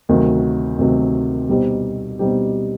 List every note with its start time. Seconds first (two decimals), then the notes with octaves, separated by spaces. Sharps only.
0.09 D2 C3 D#3 F#3
0.78 D2 C3 D#3 F#3
1.49 B2 G3 C4 D#4 G4
2.19 B2 G3 C4 D#4 G4